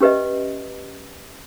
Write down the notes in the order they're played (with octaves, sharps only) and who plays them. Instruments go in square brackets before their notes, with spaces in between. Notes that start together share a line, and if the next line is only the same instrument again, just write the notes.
[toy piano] C#4 G4 B4 D#5 E5